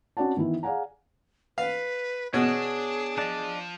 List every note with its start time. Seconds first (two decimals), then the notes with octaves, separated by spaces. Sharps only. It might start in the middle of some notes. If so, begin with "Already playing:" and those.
0.17 C4 C#4 F#4 D5 F#5 A5
0.37 D#3 E3 B3 E4
0.63 G#4 D5 F5 F#5 G#5 A#5
1.58 B4 F5
2.34 B2 D4 G#4 C#5
3.18 F3 D4 D5 D#5 A5